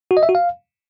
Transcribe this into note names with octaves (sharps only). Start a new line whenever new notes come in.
F#4
D#5
E5
F#4
F5